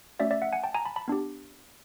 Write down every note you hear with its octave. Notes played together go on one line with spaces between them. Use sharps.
A3 C#4 F#4 D5 E5
D5 E5
E5 F#5
F#5 G#5
G5 A5
G#5 A#5
A5 B5
A5 B5
B3 D4 G4